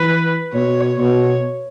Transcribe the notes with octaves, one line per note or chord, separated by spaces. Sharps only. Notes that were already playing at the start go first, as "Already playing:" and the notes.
Already playing: E3 B4
B2 C#5
B2 C#5